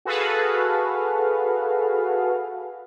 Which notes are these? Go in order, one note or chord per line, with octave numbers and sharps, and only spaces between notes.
F#4 G#4 A4 B4 F5